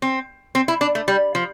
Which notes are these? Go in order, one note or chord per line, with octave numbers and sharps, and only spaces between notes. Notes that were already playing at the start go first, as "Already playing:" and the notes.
C4
C4
E4
D4
A3
G3
F3